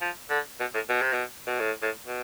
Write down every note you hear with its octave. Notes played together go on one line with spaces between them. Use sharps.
F3
D3
B2
A2
B2
C3
B2
B2
A2
A2
B2